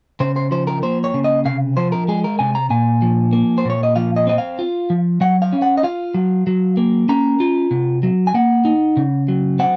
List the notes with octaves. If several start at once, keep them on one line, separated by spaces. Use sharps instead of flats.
C#3 C5
C5
F3 C5
A#4
A#3 C5
C#5
C#3
D#5
C3 F5
F3 C5
A#4
G#3 G#4
A#4
C3 G#5
A#5
A#2 G#5
F3
A#3
C5
A#2 C#5
D#5
F3 F5
D#5
C4 D#5
F5
F4
F3
F#3 F#5
F5
C#4
F#5
D#5
F4 F5
F#3
F#3
A#3
C#4 A#5
F4
C3
F#3
G#5
A#3 F#5
D#4
C#3
F#3
C4 F#5